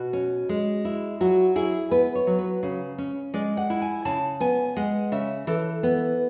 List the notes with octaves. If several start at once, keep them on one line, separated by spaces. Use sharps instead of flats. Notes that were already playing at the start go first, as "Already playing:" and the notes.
Already playing: B2 F#4
C#4
G#3
E4
F#3 F#4
E4 G#4
B3 B4
C#5
F#3
B4
C#3
C#4
G#3 D5
F#5
E4
G#5
C#3 A5
B3 G#5
G#3 F#5
C#3 E5
E3 A4
B3